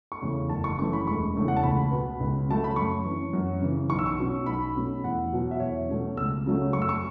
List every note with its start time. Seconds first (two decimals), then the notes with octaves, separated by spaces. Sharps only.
0.12 C#6
0.22 E2 C#3 A3 C#4
0.49 F#1 A5
0.64 C#6
0.78 F#2 E3 A3 C#4 C#6
0.93 B5
1.07 E1 C#6
1.35 E2 C#3 A3 C#4
1.48 F#5
1.56 A5
1.63 C#2 B5
1.91 B2 B3
2.20 C#2
2.48 C#3 F#3 A3 A5
2.64 B5
2.76 F#2 C#6
3.05 E3 C#4
3.33 F#2
3.61 C#3 E3
3.90 B1 C#6
3.99 E6
4.06 C#6
4.19 B2 F#3 C#4
4.46 B1 B5
4.76 B2 A3 C#4
5.04 E2 F#5
5.33 B2 F#3
5.51 E5
5.60 E2 C#5
5.89 B2 F#3 A3 C#4
6.17 C#2 E6
6.46 C#3 F#3 A3 C#4
6.73 F#2 C#6
6.82 E6
6.89 C#6